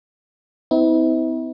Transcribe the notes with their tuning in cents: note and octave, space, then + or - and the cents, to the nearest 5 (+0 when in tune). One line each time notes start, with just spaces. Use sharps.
C4 -45 E4 -40